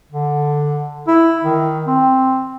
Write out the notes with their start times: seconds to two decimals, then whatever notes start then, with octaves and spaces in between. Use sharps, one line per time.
0.12 D3
1.08 E4
1.44 D#3
1.87 C4